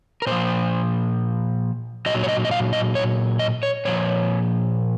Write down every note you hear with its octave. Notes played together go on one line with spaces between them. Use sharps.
A#4
A#2 F3 C5
A#2 F#3 D#5
C#5
D#5
D#5
F5
D#5
C#5
D#5
C#5
A#2 F3 C#5